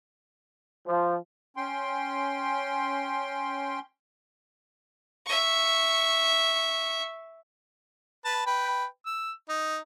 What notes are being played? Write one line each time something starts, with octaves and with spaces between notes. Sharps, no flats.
F3
C#4 G5 C6
E5 C#6
B4 A5
B4 G5 B5
E6
D#4